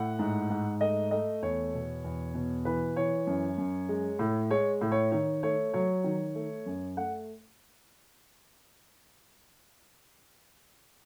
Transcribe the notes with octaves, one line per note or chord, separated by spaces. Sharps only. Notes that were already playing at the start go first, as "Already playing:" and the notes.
Already playing: A2 F#5
G#2
G#2
A3 D#5
A3 D#5
E2 C#5
B2
E2
B2
E3 B4
E3 C#5
F#2
F#2
G#3
A2
G#3 C#5
A2
C#5
D#3 C#5
A3 C#5
F#3 C#5
D#3
A3
F#2
A3 F#5